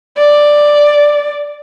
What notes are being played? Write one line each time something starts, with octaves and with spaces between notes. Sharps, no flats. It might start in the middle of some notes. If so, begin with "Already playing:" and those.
D5